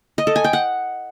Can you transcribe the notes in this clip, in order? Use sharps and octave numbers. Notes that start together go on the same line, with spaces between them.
D#5
A4
G#5
G5
F#5